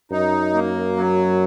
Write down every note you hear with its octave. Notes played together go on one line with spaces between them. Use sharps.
F#2 D#4
A#3
F#3